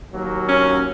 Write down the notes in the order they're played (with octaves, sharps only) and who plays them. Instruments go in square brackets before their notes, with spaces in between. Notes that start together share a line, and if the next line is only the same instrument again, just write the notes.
[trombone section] D#2 F#3 A#3
[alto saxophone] C#4